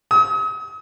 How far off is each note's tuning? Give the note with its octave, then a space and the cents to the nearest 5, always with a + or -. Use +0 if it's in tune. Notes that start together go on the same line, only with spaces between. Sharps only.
D#6 +40